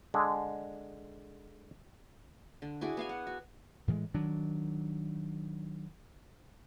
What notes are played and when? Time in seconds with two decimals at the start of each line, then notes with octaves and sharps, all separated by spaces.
0.14 D3 G#3
2.62 D3
2.81 E4 F#4 G#4 D5
2.97 B3 F5 G#5
3.09 F#5
3.27 F#4
3.88 A2 E3 F3 G#3
4.14 D#3 F#3 D4